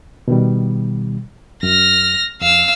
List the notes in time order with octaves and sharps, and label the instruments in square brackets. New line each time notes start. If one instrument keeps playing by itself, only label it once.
[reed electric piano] B2 D#3 G3
[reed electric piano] F#2 [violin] F6 A#6
[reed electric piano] F2 [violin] F5 E6